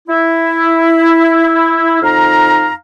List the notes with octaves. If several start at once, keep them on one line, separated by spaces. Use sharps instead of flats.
E4
F2 D#4 F5 A#5